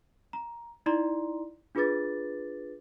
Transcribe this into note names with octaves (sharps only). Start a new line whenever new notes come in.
A#5
D#4 E4 D5 A#5 C6
D4 F4 G#4 B4 D6 A6